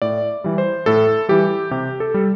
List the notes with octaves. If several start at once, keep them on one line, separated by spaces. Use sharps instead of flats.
A2 D5
E3 G3
C5
A2 A4
E3 G3 G4
C3 G4
A4
G3